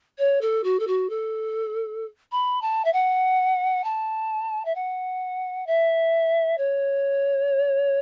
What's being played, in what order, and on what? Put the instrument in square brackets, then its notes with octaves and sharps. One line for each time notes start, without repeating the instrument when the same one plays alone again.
[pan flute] C#5
A4
F#4
A4
F#4
A4
B5
A5
E5
F#5
A5
E5
F#5
E5
C#5